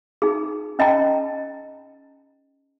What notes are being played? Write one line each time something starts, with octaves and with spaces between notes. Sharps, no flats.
D#4 G#4
C#4 D#5 G5 A5 A#5